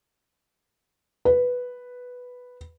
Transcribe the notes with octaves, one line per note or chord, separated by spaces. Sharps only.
B4